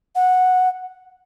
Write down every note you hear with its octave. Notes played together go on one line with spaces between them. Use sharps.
F#5